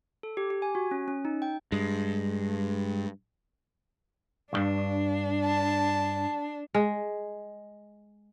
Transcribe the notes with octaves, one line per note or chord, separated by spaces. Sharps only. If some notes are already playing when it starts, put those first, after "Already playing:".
A4
G4
G4
G#5
F#4
C#4
C#4
D#4
G5
G2 G#3
B1 G2 D4
A5
G#3